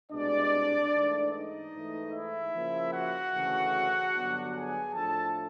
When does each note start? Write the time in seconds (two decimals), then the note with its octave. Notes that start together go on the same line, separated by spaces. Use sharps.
0.12 C2 B2 G#3 D4 D5
0.93 G#2 E3 A3
1.32 D#4 D#5
1.73 G#2 E3 A3
2.13 E4 E5
2.54 C#3 F3 A#3
2.94 F#4 F#5
3.33 D2 C#3 E3 A3
4.15 G2 D3 F#3 B3 D4
4.54 G#4 G#5
4.94 A2 F3 A3 D4 A4 A5